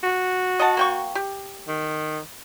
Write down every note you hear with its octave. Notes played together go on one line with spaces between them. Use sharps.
F#4
D#5 F#5 A5
A#3 G5 C#6
G4
D#3